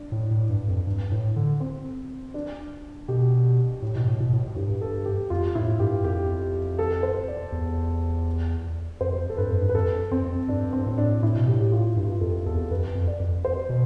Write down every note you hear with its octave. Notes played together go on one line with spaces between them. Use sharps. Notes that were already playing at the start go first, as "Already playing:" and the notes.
Already playing: D4
A2
A2
G2
F2
G2
A2
D3
C4
D4
B2 G4
A2
B2
A2
B2
A2
A2
G2 G4
A4
G4
F2 F4
A2 E4
G2 G4
F2 G4
A4
C5
D5
E2
F2 C5
A4
G2 B4
F2
G2
B4
F2 A4
F2 C4
G2 D4
C4
A2
D4
A2 E4
B2
A2 G4
G4
F4
G2 G4
F4
G4
F2 A4
E2 A4
F2 B4
F2
D5
F2
C5
B2